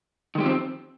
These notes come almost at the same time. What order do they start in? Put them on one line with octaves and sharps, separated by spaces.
D#3 G#3 G4 F3 C4